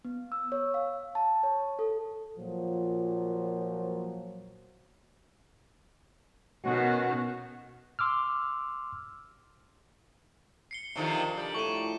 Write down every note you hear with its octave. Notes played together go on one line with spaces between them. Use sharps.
B3
E6
C#5
F5
A5
C#5
A4
A#2 F3 F#3
B2 D#3 B3 C#4 F#4
C6 D6 E6 F6
C7 C#7 G7
C3 D#3 F3 D4 G#4 A4
F3 G3 A#4 G5
A2 C#6 D#7